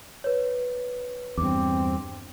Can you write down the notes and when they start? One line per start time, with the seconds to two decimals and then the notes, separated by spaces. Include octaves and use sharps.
0.24 B4 C#5
1.38 E2 G2 C4 D6